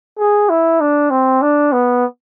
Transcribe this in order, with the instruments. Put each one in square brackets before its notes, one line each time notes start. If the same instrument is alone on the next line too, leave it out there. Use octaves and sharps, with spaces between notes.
[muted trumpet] G#4
E4
D4
C4
D4
B3